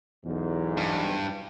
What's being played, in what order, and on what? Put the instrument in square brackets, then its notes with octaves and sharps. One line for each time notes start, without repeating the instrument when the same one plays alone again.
[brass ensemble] B1 E2 G#2
[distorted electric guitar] G2